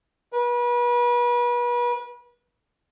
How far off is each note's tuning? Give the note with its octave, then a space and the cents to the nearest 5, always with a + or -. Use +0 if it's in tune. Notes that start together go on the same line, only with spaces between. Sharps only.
B4 -35